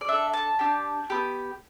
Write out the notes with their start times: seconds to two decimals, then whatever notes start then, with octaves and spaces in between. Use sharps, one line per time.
0.01 D5
0.08 D4 A4 E5
0.33 A5
0.59 D4 G4
1.10 B3 G4